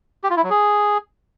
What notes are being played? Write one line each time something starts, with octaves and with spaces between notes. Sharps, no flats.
G4
F4
E4
F#3
G#4